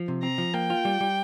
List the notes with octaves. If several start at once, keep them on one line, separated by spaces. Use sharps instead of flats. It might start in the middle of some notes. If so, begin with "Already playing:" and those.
Already playing: F3
C3
C4 A#5
F3
A#3 G5
F4
G3
G3